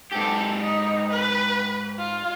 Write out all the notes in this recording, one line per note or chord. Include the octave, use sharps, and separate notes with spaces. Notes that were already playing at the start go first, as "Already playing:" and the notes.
G#2 G4 A4
D#4
B4
F4